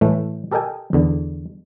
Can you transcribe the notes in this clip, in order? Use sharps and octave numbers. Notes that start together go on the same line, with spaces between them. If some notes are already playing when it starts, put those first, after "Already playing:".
A2 E3 A3
G4 A4 A#4 D#5 G5 G#5
E2 D3